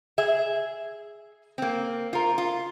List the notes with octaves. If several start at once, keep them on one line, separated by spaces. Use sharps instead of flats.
G#4 E5
A#3 C4
F4 A#4
F4